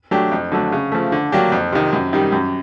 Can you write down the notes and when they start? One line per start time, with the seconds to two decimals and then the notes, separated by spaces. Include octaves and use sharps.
0.11 F#3 A3 D4 G4
0.32 F2
0.52 D3 F#3 A3
0.72 C#3
0.92 F3 A3
1.12 D3
1.32 F#3 A#3 D4 G4
1.52 F2
1.72 C3 D#3
1.93 F#2
2.13 D#3 G3
2.32 F#2